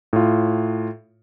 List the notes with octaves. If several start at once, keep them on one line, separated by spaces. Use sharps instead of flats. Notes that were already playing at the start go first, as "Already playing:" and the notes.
A2 F4